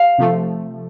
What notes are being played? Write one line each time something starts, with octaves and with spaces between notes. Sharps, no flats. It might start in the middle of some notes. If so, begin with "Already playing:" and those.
Already playing: F5
C3 F3 A3